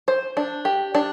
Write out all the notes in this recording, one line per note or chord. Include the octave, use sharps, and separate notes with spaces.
C5
D4
G4
D4